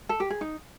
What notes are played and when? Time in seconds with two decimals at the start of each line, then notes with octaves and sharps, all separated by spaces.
0.09 A4
0.20 G4
0.30 G#4
0.41 D#4